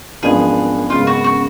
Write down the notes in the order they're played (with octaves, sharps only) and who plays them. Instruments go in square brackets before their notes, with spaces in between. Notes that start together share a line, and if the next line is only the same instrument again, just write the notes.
[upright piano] G#1 F#2 F3 B3 D4 [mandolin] G#4
[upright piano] G#1 F#2 C#3 G#3 B3 [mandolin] F4
[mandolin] F#4
F#4